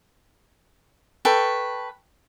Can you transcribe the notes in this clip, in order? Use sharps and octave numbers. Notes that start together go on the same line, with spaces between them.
A4 B4 G5 C#6